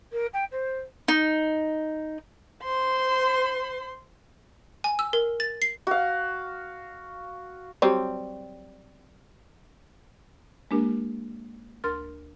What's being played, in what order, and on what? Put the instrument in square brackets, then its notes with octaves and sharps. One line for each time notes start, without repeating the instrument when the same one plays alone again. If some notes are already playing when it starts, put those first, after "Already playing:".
[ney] A#4
G5
C5
[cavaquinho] D#4
[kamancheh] C5 C6
[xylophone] G#5
E6
A#4
A6
C7
[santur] F#4 F5
[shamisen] F#3 G3 C4
[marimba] G#3 A#3 D4 G4 A#4
D2 A#4 C6 F6 A6